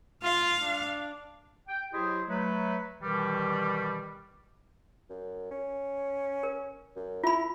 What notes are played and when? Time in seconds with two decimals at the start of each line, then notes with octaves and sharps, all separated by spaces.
0.23 F4 F5
0.62 D4
1.68 G5
1.93 F#3 E4 G4 G#4 C5 D#5
2.29 F#3 A3 B4
3.01 B2 D#3 E3 G3
5.10 F#2
5.51 C#4
6.43 A#4
6.96 F#2
7.24 E4 F4 B5